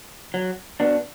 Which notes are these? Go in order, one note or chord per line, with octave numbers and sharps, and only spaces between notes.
F#3
B3 D4 F#4